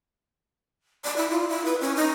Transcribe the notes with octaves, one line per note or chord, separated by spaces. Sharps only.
D5
E4
F4
E4
B4
C#4
D#4